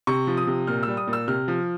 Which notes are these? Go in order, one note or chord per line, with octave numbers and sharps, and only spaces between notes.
C3 C#6
F3
D#6
C3
A#2 F6
G3 E6
D#6
A#2
E6
C3 F6
F3